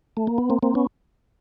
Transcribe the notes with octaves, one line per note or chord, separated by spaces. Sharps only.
A3
A#3
B3
A#3 C4
A#3 C4
B3 C#4